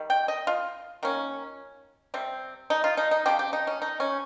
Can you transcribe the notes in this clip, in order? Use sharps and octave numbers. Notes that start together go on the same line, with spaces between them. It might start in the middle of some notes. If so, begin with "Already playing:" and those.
Already playing: D#3 G3
G5
D#5
F4
D#3 A#3 C#4
C3 G3 C4
D#4
F4
D#4
D#4
C#3 F3 C4 G4
G4
D#4
C#4
D#4
C#4